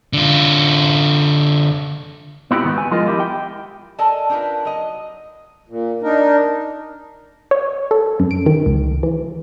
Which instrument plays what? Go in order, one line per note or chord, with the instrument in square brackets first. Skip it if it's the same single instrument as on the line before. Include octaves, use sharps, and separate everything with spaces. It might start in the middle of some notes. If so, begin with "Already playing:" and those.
[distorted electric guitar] D3 F4
[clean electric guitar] B3 E4 F#4 G4
G#2 D#3 B3
G#5
F3 G#3 F4 A#4 D#5
E4 G4 E5
G5
[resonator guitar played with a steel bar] A4 A#4 D5 D#5 G#5 A5
D4 D#4 F4 A#4 B4
F#3 D#5
[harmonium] A#2
D4 D#4 A#4
[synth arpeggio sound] C#5
A4
F#2
D7
D#3
C#2
E3